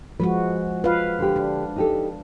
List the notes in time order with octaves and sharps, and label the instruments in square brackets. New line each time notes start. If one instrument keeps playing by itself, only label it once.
[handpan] F3 G#3 F#4 [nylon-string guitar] B4
[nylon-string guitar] F4 [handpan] B4 F5
[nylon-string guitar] D3 G4
[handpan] D4
[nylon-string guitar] D#4 G4 A4